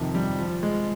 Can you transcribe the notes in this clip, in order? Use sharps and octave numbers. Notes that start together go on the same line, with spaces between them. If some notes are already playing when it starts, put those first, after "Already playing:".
Already playing: F2 C3 D#3
G3
F3
G#3